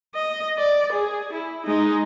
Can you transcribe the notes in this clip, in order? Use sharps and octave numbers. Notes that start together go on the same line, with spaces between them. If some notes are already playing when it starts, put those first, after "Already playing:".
D#5
D5
G#4
E4
G#3 D#4